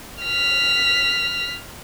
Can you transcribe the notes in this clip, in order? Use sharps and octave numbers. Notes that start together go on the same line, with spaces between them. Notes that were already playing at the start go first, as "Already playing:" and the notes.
F6 B6